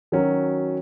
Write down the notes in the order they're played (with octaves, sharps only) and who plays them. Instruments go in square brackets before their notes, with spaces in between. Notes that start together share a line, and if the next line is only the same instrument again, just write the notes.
[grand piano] D#3 F#3 C#4 F#4